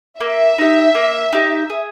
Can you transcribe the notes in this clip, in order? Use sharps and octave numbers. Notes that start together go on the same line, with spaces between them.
A#3 E5
D#4 G4
A#3
D#4 G4
G#4